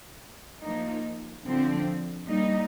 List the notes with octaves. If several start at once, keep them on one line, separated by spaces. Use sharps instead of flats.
F3 A#3 D#4
D3 F3 C4
G3 A#3 D#4